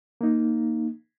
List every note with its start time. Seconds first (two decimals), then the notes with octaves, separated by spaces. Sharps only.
0.21 A#3 D#4